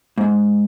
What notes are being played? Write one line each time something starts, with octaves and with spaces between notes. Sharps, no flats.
G#2